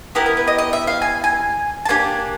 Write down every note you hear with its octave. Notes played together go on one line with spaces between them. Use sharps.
B3 E4 G4 A#4
A#4
B4
D#5
D#5
E5
F5
G#5
G#5
A5
A#3 D4 G4 G#5